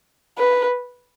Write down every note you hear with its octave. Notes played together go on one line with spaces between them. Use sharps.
B4